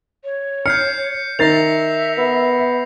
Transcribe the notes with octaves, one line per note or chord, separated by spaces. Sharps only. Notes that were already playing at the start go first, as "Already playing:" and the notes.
C#5
F6 G6 C7 C#7
D#3 A#4 E5 A6 A#6 C7 F7
B3